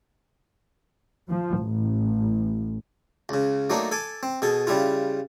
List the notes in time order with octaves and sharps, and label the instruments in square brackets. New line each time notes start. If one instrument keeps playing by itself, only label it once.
[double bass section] F3
A1
[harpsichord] C#2 C#3
F#3 A3 A#3 D4 D#4
A4 G#5 D6
C4
B2 G#4 A4
C#3 G3 E4 F4